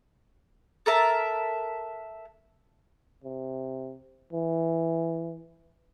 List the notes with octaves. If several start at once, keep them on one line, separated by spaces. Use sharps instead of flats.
A4 A#4 E5 A5
C3
E3